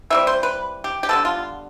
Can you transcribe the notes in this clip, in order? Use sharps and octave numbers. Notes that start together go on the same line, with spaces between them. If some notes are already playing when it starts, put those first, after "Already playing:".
E3 G3 C4 E5
C5
B4
G4
G4
D3 G3 B3 A4
F4